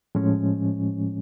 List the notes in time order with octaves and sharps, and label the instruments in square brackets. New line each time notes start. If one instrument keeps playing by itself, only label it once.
[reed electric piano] A2 F3 G#3 C#4